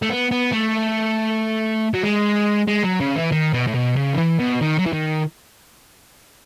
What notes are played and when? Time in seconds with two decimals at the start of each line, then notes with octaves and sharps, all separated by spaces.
0.02 A3
0.10 B3
0.31 B3
0.52 A3
1.94 F#3
2.03 G#3
2.67 G#3
2.83 F#3
3.00 C#3
3.16 E3
3.32 D#3
3.53 B2
3.67 A2
3.74 B2
3.96 C#3
4.14 D#3
4.18 E3
4.39 B2
4.61 D#3
4.79 F#3
4.86 E3
4.93 D#3